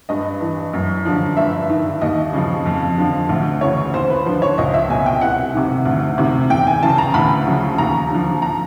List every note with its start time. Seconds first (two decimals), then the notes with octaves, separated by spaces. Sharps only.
0.09 G2 D#5
0.41 E3
0.73 F#2
1.05 D3 F3
1.37 G2 E5
1.70 D#3
2.02 D#2 D#5
2.33 C#3 F3
2.66 F2
2.98 D3 F3
3.29 D2
3.61 C#3 E3 C#5
3.94 D#2 C5
4.10 B4
4.26 D3 F3 C5
4.42 C#5
4.58 C#2 D#5
4.74 E5
4.90 B2 G#5
5.06 G5
5.21 C2 F#5
5.54 C3 D#3
5.86 D2
6.18 C3 D#3
6.50 E2 G5
6.67 G#5
6.83 C#3 E3 A5
6.98 A#5
7.14 D2 B5
7.47 C#3 F3
7.78 D#2 A#5
8.11 D3 F3
8.42 A#5